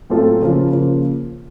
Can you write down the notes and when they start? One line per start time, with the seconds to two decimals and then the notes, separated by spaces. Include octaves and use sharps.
0.10 A2 F#3 C4 F4 A4
0.40 C#3 F3 A#3 F4 C5
0.71 C#3 F3 A#3 F4 C5